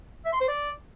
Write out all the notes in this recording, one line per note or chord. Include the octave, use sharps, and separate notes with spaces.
E5
C6
C5
D5